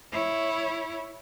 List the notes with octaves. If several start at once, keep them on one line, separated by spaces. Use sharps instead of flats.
E4 C#5